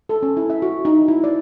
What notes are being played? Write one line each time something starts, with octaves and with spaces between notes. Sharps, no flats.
A4
C#4
E4
E5
F#4
D#4
E4
D5